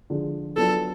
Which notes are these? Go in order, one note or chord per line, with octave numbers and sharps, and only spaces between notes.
D3 F3 G#3
F#3 B3 D4 F4 A4